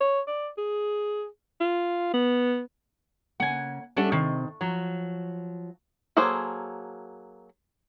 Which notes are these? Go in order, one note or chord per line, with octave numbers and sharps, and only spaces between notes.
C#5
D5
G#4
F4
B3
C#3 A#3 F#5 G#5
G3 A3 C#4 D4 A4 F#5
C3 D#3 D#5
F3 F#3
F#3 A#3 G#4 A4 C5